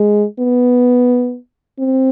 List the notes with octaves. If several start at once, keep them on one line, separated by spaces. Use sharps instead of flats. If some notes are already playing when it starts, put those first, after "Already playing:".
Already playing: G#3
B3
C4